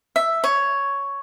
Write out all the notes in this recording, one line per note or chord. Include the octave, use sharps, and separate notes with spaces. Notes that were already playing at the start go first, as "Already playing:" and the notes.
E5
C#5